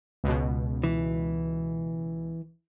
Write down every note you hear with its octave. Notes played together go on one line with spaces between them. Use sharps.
C#2 B2
E3